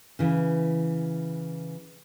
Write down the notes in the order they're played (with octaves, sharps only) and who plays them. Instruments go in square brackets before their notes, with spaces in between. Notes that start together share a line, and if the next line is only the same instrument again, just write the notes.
[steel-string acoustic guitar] C#3 E3